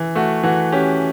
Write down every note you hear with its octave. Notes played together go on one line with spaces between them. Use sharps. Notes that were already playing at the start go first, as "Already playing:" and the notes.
Already playing: E3
A3 F#4
E3 F#4
C#4 G4